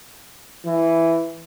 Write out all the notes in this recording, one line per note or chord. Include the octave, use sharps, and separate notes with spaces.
E3